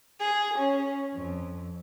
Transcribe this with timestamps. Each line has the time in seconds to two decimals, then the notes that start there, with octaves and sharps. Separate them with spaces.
0.20 G#4
0.57 C#4
1.14 F2